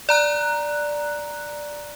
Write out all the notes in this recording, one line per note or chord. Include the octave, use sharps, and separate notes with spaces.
D5 A#5 F#6